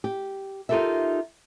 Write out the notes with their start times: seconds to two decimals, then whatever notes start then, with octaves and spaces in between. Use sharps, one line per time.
0.04 G4
0.69 D#4 F4 G4 A4 A#4 E5